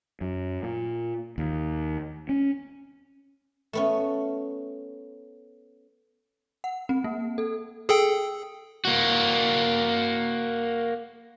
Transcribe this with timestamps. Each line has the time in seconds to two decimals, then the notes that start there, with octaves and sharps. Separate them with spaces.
0.21 F#2
0.63 A#2
1.38 D#2
2.29 C#4
3.73 A3 B3 C#4
6.64 F#5
6.89 C4
7.04 A#3
7.38 A4
7.89 G#4 A4 G5
8.85 A#3 F#4